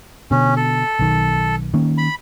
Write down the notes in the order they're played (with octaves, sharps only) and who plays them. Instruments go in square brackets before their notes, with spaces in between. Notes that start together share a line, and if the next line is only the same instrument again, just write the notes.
[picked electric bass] B2 D3 [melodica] C#4
[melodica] A4
[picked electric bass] B1 D#3
D#3 A#3 C#4
[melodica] B5